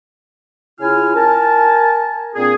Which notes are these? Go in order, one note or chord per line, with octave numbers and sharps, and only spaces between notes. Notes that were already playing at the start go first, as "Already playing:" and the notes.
C#3 E4 F4 G#5 F6
A#4 G#5 A5
A#2 C4 D4 G#4